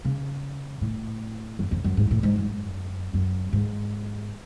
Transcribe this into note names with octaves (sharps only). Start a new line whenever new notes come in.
C#3
A2
F#2
F2
F#2
G#2
A2
G#2
F#2
F#2
G#2